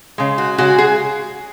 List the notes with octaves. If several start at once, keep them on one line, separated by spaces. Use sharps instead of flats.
C#3 G#3
F#4
C#3 G#3 F#4
G#4